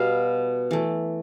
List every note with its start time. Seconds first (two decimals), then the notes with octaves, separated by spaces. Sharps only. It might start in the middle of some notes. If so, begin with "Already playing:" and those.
Already playing: B2 G3 B3 F5
0.71 E3 A3